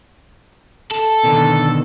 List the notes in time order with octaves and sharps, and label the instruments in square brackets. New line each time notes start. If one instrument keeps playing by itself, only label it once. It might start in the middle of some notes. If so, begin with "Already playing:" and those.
[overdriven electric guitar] A4
[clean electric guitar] B2 D3 D#3